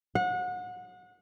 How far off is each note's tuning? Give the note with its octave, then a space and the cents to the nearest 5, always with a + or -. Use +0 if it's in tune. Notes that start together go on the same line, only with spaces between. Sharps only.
F#5 -30